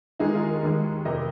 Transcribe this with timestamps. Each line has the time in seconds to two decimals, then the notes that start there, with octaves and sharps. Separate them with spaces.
0.19 D#2 D#3 G#3 D#4 G#4
0.35 F4 A#4
0.63 D#2 D#3 G#3
1.05 F1 F2 C3 A#4 D#5